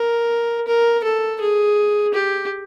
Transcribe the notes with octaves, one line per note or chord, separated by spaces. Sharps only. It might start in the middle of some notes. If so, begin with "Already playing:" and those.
Already playing: A#4
A#4
A4
G#4
G4